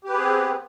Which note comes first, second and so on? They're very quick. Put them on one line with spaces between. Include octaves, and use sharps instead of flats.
G4 B4 G#4 C4 B3